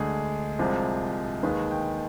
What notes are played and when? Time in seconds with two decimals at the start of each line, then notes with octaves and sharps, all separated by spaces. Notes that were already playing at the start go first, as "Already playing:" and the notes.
Already playing: D2 D3 G#3 G#4
0.59 C2 C3 F3 G#3
1.43 D#2 D#3 G#3 B4
1.71 G5